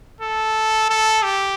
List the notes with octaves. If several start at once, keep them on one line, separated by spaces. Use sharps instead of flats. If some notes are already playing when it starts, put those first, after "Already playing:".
A4
A4
G4